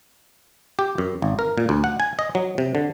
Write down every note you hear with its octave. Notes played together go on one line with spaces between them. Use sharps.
G4
F#2
G#1
A#4
A#2
D2
F#5
G#5
D#5
F#3
C3
D3